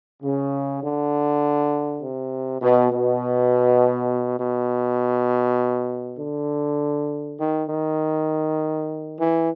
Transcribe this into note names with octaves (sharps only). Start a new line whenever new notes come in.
C#3
D3
C3
B2
B2
B2
D3
D#3
D#3
E3